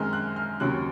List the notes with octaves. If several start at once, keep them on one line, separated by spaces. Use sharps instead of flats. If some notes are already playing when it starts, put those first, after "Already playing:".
Already playing: F#2 D#3 G#3 C4 F6
F#6
F6
D#2 C#3 F#3 C4 F#6